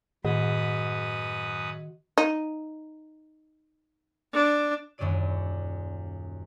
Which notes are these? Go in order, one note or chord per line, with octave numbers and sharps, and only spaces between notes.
F#2 A2 D#3 F#4 B4 D#5 D#6
D#4
D4
D#1 F#2 F#3 G3 D5 D#7